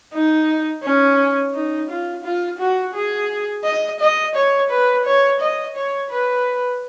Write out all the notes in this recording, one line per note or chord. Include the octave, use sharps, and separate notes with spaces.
D#4
C#4
D#4
F4
F4
F#4
G#4
D#5
D#5
C#5
B4
C#5
D#5
C#5
B4